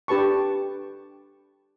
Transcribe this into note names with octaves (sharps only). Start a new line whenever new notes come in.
D4 G4 B4 A5 C#6